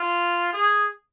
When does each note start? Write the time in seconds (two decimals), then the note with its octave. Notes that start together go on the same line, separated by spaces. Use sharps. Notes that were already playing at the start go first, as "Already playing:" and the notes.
Already playing: F4
0.53 G#4